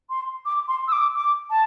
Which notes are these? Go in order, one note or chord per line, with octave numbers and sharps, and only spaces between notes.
C6
D6
C6
E6
D6
D6
A5